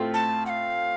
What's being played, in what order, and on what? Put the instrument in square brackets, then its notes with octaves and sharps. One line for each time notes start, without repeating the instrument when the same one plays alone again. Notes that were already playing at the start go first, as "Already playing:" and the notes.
Already playing: [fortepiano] A2 A3 C4 F4
[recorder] A5
F#5
F5